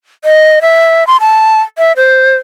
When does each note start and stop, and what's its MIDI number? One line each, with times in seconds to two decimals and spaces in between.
0.25 0.59 75
0.62 1.06 76
1.07 1.17 84
1.21 1.61 81
1.78 1.92 76
1.97 2.36 72